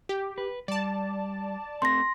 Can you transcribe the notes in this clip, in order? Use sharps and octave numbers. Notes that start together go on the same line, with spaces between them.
G4
B4
G3 D5 A5
A3 C4 C6 A#6